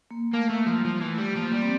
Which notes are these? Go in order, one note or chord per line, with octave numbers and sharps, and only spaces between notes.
A#3
A3 A#3
A3
A#3
F3
G3
F3
E3 A3
G3
F3 A#3
G3
C4